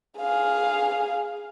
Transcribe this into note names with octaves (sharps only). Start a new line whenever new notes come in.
G#4 F5